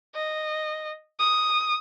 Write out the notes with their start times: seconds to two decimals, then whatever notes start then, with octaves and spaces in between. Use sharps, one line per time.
0.15 D#5
1.20 D#6